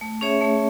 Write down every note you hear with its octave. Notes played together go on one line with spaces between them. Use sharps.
A3
C#4 G#4 C#5 E5
A3